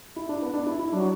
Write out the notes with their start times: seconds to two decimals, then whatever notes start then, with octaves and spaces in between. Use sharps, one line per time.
0.16 E4
0.29 D4
0.42 B3
0.53 D4
0.66 E4
0.79 E4
0.92 F#3 D4